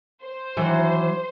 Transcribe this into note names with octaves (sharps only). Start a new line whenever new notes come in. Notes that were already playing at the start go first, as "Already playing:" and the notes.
C5
D#3 E3 F#3